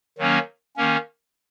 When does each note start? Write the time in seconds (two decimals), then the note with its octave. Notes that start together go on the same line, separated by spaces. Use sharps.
0.18 D#3 F#3 A#3 C#4
0.76 D#3 A#3 C#4